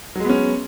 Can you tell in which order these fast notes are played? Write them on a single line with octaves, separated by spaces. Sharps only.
F#3 G#3 B3 C#4